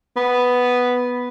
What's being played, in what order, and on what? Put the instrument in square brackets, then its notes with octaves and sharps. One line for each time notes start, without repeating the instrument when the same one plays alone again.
[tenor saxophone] B3